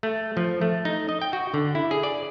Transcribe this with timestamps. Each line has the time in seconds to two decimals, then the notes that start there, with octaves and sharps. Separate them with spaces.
0.03 A3
0.37 F3
0.61 A3
0.85 D#4
1.09 D#5
1.22 G5
1.33 F#4
1.54 D3
1.75 E4
1.91 G#4
2.03 D5